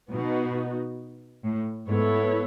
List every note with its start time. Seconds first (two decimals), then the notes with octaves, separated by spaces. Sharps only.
0.10 B2 B3 D#4 F#4
1.43 A2
1.88 G#2 B3 E4 A4 C#5